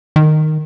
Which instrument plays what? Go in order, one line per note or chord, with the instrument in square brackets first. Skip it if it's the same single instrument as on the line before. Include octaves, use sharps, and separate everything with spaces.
[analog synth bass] D#3